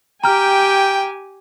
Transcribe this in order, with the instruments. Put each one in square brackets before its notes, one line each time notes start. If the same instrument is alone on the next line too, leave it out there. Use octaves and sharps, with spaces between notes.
[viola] G4 G#5 [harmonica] G5 [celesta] A#5 F6